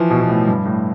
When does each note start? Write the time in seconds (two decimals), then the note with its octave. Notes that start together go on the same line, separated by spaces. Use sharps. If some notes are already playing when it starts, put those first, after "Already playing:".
Already playing: E3 F3
0.10 B2
0.21 B2
0.29 A2
0.48 G2
0.66 A2